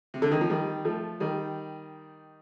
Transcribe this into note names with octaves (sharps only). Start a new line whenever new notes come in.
C3
D3
D#3
F3
D#3 G3
F3 A3
D#3 G3